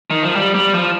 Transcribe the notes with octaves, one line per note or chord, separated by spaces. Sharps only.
D#3
F3
G3
G3
F3